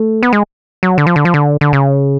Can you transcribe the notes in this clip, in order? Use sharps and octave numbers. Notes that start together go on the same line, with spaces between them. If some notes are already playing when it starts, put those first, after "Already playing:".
Already playing: A3
B3
G#3
F#3
D3
F3
D3
F3
D3
D3
C#3